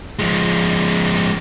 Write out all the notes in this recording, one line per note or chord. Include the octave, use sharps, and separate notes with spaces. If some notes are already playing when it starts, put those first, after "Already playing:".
F3 G#3